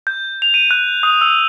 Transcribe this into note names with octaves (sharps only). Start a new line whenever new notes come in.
G6
F7
D#7
F#6
D#6
E6